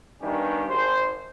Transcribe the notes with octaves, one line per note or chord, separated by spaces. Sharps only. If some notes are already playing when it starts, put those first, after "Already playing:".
G2 D#3 B3 C#4 D4 G4
G#1 C5